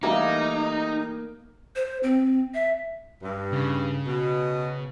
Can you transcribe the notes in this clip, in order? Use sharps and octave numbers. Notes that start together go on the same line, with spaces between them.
E3 G3 A3 A#3 D#4
C5
C4
E5
G2
C#3
B2